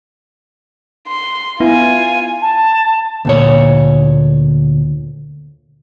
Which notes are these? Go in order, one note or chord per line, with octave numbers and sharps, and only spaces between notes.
C6
B3 E4 F4 G#5
A5
D2 A#2 C#5